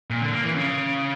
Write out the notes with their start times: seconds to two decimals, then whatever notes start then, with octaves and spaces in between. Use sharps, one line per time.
0.10 A#2
0.21 D3
0.33 A#3
0.44 E3
0.55 C#3